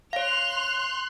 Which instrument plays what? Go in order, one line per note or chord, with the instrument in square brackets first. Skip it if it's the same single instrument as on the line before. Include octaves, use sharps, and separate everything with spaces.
[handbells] C#5 F5 [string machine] C6 F#6 [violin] F7